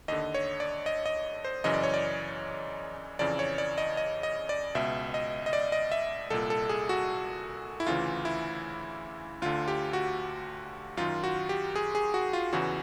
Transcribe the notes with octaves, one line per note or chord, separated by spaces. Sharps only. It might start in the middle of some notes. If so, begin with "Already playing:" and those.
D#2 D3 D#5
C#5
D5
D#5
D#5
C5
F#2 C#3 E3 D#5
D5
C#5
D5
F2 C#3 E3 D5
C#5
D5
D#5
D#5
D#5
D5
C#2 B2 E5
D#5
D#5
D5
D#5
E5
C2 A#2 A4
A4
G#4
F#4
E4
D2 C#3 E3 F4
E4
D2 D3 F4
G4
F#4
F#2 D#3 F4
F#4
G4
G#4
G#4
F#4
F4
E2 C#3 E3 F#4